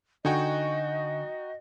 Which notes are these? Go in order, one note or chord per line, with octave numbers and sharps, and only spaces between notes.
D3 D#4 F#4 D#5 G5 G#5 C#6